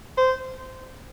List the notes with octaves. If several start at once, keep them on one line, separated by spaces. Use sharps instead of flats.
C5